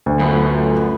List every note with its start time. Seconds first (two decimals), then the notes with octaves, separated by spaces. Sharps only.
0.06 D2
0.19 F#2 A3 B3 F4